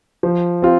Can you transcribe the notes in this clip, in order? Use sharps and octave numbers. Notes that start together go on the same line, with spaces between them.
F3
C4 F4